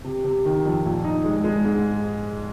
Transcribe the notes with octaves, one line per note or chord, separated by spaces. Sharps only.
C3
C3
D#3
F2
A#2
D#4
G#3
G#3
G#2